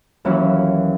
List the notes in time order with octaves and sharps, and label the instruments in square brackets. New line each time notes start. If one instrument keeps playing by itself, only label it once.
[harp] D#2 E3 F#3 C#4